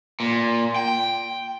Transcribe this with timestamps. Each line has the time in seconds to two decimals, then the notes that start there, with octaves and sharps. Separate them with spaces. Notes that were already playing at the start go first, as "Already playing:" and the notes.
0.20 A#2
0.76 G5